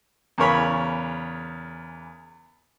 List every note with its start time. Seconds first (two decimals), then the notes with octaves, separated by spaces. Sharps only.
0.38 E2 C#3 A#4 C#5 B5